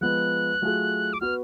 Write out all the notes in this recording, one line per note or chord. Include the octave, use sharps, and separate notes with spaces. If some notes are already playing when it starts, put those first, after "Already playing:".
F3 G#3 B3 F#6
F#3 A3 F4 G#4
D6
B3 F#4 B4 F6